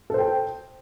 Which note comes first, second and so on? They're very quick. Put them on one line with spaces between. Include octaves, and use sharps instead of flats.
A4 C5 G5